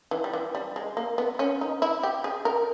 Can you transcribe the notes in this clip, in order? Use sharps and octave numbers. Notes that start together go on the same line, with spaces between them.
E3
G3
E3
G3
G#3
A#3
B3
C#4
D#4
E4
G4
G#4
A#4